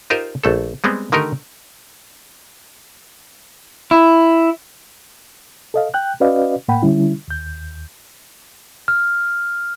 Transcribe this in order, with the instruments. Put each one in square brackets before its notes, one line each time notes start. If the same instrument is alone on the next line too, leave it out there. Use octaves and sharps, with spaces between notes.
[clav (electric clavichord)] D#4 F4 G4 A#4 C5 D#5
A#1 A3 A4
G3 G#3 B3 C4
D3 D#3 A3 D#4 G4 A#4
[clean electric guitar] E4
[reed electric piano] A4 D#5 F5
G5 F#6 G6
C#4 F#4 B4 D5 D#5 F5
A2 A#3 F#5 G5 B5
D3 G3 C#4 E4
D#2 G6
[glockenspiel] F6